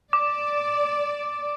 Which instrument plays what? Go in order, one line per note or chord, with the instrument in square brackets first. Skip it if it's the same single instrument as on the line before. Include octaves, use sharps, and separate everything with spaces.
[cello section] D5 [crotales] D6